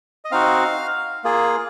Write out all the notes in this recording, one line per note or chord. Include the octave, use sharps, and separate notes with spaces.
D#5
C4 D#4 F#4 F5
A#3 F4 G#4